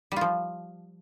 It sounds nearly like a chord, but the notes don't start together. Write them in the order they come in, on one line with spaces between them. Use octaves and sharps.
G3 F4 F3